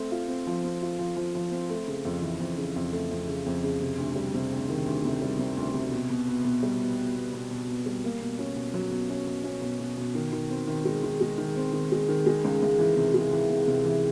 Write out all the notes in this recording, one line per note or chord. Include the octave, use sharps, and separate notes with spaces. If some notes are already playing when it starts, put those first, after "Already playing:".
Already playing: A3 C4
F4
C4
F3
C4
F4
F3
F3
F3
C4
A3
C#3
F2
E3
F2
C#3
F2
A3
F2
C#3
F2
C#3
C3
D2
G3
C3
D2
D#3
D2
C3
G3
C3
D2
C3
B2
B2
B3
B2
G3
B3
B3
B3
B2
B2
B3
G3
A#3
B2
C#4
B2
F#3
B2
C#4
B2
C#4
B2
B2
B2
D#3
D#3
C4
D#3
G#3
D#3
G#3
D#3
C4
D#3
G#3
D#3
G#3
C#2
C#2
E3
C3
G#3
E3
C3
C3
E3